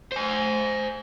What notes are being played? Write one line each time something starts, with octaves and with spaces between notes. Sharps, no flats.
C5 G#5